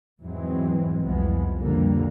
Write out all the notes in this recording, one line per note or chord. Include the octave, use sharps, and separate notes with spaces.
E2 G#2 E3 F#3 G#3 C4
C2 F2 E3 F3 G#3 B3
F2 B2 D3 G3 A#3